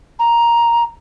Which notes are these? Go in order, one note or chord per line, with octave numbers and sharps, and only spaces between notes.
A#5